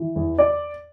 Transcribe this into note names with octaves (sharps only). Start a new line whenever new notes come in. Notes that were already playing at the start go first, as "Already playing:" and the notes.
Already playing: E3
E2
D5